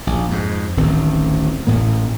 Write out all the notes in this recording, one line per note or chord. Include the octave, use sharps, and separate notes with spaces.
A#1
F2 G#2
D1 A1 D#3 C4
A1 A2 A#3